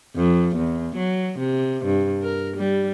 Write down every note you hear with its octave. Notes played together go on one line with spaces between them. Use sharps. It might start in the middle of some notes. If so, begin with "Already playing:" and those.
F2
E2
F#3
C3
G2
A#4
G3